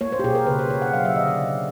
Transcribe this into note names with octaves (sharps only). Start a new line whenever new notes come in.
A#3 C#5
C5
G4
B2 G#4
A#4
C#3 B4
C5
C#3 C#5
F#5
F#3 F5
E5
D3 D#5
D5
C#3